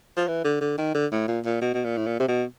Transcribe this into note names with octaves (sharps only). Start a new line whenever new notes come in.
F3
E3
D3
D3
D#3
D3
A2
A#2
A#2
B2
B2
A#2
A2
A#2
C3
B2